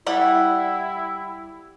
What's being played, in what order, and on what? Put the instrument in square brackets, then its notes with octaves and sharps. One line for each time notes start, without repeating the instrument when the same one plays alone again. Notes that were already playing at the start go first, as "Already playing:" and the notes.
[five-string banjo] G3 A4 F#5 [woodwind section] E4